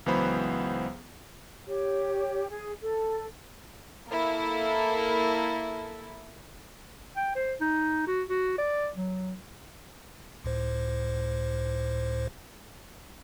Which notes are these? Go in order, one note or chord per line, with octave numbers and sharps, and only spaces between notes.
C#2 E3 F#3 B3 C5 B5
G4 C#5
G#4 G#5
A4
A#3 E4 A4
G5
C5
D#4
F#4
F#4
D5
F#3
C#2 A2 C5